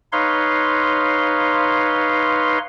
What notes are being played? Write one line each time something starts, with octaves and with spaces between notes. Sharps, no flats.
D#4 B4 C#5 F5 C6